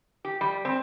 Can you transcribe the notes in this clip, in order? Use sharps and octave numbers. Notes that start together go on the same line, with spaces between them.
G4
G3
C4